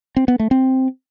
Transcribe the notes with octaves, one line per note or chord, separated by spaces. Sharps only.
C4
B3
A3
C4